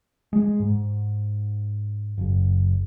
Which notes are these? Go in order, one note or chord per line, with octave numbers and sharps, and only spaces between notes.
G#3
G#2
F#1